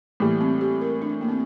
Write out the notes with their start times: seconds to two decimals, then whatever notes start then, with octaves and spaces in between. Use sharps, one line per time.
0.20 A2 E3 G3 A#3
0.41 C4
0.61 G4
0.81 A#4
1.02 D4
1.21 A#3
1.29 C4